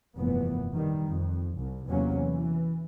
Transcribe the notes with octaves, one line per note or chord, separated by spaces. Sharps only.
F1 G2 A#2 E3 B3
D#3 G3
F2
C2
E2 C3 E3 F#3 A#3 C#4
E3